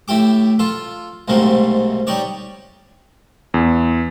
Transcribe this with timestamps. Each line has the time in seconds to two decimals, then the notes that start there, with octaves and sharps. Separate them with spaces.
0.08 A2 E4 G4 D6
0.59 F4 A4
1.28 B1 G#2 C3 A3 A#3
2.07 G3 D#4 C#5 D5
3.54 E2